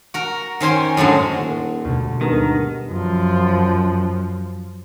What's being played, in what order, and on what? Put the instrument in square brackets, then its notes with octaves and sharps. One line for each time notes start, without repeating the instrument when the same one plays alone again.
[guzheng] F#4 A#4
D#3 C#4 C5 G#5 C6
F#2 A2 D3 G#3
[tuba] D#1 [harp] F#5
[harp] D2 B2 G#3
[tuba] G2 [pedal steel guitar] D#3 [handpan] G#3 B3 A#4 [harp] D#6
[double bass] F#2 F3